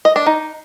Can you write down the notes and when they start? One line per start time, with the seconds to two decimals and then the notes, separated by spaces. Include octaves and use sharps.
0.05 D#5
0.16 D4
0.26 D#4